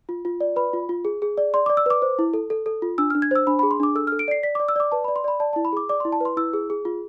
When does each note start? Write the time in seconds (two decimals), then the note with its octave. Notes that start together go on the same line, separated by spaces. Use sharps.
0.09 F4
0.25 F4
0.41 D5
0.56 B4 B5
0.73 F4
0.89 F4
1.05 G#4
1.22 G#4
1.38 D5
1.54 D5 C6
1.66 D6
1.70 D5
1.77 E6
1.86 B4 D6
2.02 C5
2.19 E4
2.34 A4
2.50 A4
2.66 A4
2.82 F4
2.98 D4 E6
3.10 F6
3.15 D4
3.22 G#6
3.31 C5 E6
3.47 D4 B5
3.59 B5
3.63 G#4
3.71 C6
3.80 D4 D6
3.95 A4 E6
4.07 F6
4.12 A4
4.19 D7
4.28 D5 C7
4.43 D5 B6
4.55 D6
4.60 D5
4.69 E6
4.76 D5 D6
4.92 B4 A5
5.04 B5
5.08 D5
5.16 C6
5.24 D5 B5
5.40 D5 A5
5.53 A5
5.56 E4
5.65 B5
5.73 G#4 D6
5.89 D5 D6
6.00 C6
6.05 E4
6.12 A5
6.20 B4 C6
6.37 E4 E6
6.53 G#4
6.70 G#4
6.85 F4